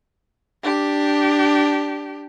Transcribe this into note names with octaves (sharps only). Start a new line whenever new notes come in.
D4 G4